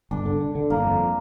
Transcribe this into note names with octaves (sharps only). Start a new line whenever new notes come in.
G1 D4
D3
D3
D3
G1 A#3
F2